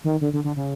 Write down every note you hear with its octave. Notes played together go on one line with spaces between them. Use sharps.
D#3
D3
D3
D3
C#3